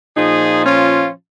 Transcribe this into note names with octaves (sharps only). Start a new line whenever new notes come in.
A#2 F3 D#4 G#4
C#4 F4